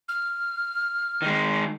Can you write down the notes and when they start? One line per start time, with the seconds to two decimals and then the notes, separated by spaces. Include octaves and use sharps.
0.09 F6
1.22 D#3 G#3